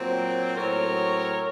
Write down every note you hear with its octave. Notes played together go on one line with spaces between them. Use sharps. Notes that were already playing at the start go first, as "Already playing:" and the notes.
Already playing: A#2 F#3 C4
A2 F#3 C4 A#4 C#5